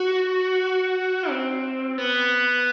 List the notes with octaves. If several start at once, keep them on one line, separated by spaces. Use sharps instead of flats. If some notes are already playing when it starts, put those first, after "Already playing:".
Already playing: F#4
C4
B3